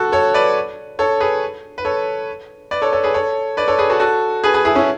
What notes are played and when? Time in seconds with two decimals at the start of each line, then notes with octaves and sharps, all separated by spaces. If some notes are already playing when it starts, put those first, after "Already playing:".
Already playing: F#4 A4
0.12 A4 C#5
0.34 B4 D5
0.99 A4 C#5
1.20 G#4 B4
1.78 B4
1.85 A4 C#5
2.71 B4 D5
2.82 A4 C#5
2.92 A4 C#5
3.03 G#4 B4
3.14 A4 C#5
3.57 B4 D5
3.68 A4 C#5
3.78 G#4 B4
3.90 F#4 A4
4.00 F#4 A4
4.44 G#4 B4
4.54 G#4 B4
4.65 E4 G#4
4.75 C#4 E4